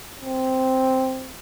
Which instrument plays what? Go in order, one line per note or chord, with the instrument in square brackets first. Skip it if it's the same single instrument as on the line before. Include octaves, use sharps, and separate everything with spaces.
[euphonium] C4